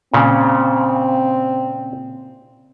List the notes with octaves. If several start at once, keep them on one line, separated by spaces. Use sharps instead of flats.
A#2 C#3 C4